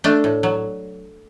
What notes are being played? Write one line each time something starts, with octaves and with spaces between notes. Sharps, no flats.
A3 D4
A2
F#3